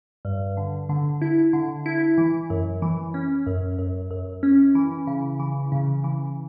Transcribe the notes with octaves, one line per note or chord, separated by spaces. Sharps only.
G2
D3
D3
E4
D3
E4
E3
F#2
E3
C#4
F#2
F#2
F#2
C#4
E3
C#3
E3
C#3
E3